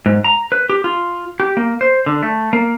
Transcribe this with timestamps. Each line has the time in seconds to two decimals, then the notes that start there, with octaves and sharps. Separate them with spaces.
0.06 G#2
0.24 A#5
0.52 B4
0.70 G4
0.84 F4
1.40 G4
1.57 A#3
1.81 C5
2.06 D3
2.23 A3
2.53 A#3